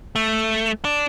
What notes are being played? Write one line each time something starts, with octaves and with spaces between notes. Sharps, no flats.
A3
D4